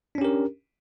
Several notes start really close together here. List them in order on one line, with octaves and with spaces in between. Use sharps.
D4 C#4 G4 A#4